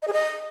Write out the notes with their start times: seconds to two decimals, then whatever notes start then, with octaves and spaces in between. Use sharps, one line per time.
0.02 D#5
0.08 G#4
0.13 D#5